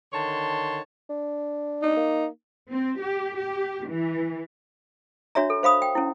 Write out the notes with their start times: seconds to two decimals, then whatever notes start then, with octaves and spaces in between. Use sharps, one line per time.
0.13 D3 D#3 C#5 A5 C6
1.10 D4
1.82 D#4
1.97 A#3
2.69 C4
2.99 G4
3.36 G4
3.87 E3
5.35 D4 F#4 C#5 E5 A#5
5.50 A4
5.63 C5 F5 B5 D#6
5.82 G5
5.95 C#4 E4